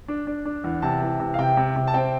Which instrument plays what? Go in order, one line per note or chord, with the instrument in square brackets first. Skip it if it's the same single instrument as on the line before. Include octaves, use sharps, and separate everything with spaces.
[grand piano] D4
D4
D4
E2
C3 A5
E3
C3
F5
C3 G5
C3
C3
A5
C4 G5